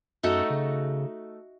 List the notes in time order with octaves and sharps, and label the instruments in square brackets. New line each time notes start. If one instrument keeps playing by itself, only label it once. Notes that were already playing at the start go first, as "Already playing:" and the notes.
[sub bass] F#2 [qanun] A3 D#4 F#4 A4
[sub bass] C#3